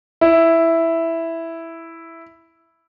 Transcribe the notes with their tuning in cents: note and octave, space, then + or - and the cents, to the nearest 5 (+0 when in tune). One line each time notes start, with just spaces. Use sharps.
E4 +0